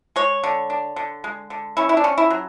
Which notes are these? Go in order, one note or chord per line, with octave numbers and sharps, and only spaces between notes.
G#3 C#5
D3
D4
D3
G#3
D3
C#4 E4
E4
D4
C#4
E4
F#3